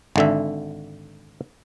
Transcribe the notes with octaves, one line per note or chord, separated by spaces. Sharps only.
G#1 D3 E5